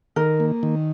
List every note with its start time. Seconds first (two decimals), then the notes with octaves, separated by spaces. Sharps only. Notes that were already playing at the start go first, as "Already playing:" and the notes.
0.16 D#3 A#4
0.40 A#3
0.63 D#3